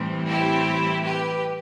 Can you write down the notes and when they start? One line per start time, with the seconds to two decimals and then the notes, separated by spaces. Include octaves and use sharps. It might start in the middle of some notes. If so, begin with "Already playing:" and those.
Already playing: A2 E3 G3 C4
0.28 E4 G4
1.05 G4 B4